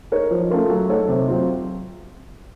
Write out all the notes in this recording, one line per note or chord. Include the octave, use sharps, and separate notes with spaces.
D#4 A#4 C#5
F3
A3 C#4 F4 A#4
F#3
A3 D#4 A4 C#5
C3
F#3 C4 F4